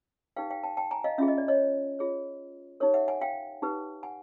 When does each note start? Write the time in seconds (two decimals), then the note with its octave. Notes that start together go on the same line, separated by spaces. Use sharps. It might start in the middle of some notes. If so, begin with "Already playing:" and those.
0.36 D#4 G4 B4 F5 G5
0.50 F5 G5
0.63 G5 A5
0.77 G5 A5
0.91 G#5 A#5
1.04 D#5 F5
1.18 C#4 F4 G#4 E5
1.28 D#5
1.38 D5
1.48 C#5 D#5
1.99 F4 G#4 C#5
2.80 D#4 G4 A#4 C#5
2.94 E5 F#5
3.08 F#5 G#5
3.21 F5 G5
3.62 D#4 G4 B4
4.03 F#5 G#5